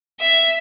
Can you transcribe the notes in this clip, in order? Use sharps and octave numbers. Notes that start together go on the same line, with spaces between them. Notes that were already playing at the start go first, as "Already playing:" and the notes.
E5